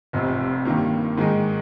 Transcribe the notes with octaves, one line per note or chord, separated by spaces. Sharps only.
F1 F2 C3
G2 D#3 A#3
G#2 D#3 G#3 D#4